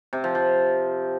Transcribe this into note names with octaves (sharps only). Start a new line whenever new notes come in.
C3
F3
F3